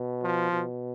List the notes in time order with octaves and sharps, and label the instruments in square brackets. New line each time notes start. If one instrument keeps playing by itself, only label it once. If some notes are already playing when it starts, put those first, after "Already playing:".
Already playing: [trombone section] B2
F3
B2